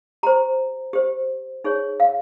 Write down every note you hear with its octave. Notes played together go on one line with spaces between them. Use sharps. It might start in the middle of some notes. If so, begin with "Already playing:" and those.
G4 C5 A#5
G4 C5
D#4 G#4 C#5
F5